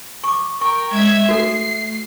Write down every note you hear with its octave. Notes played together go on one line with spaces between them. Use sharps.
C#6 D6
A#4 G5 C#6
G#3 C#4 E5 G#6
A3 F#4 A4 C7